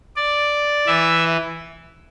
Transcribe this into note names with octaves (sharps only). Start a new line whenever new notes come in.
D5
E3 E5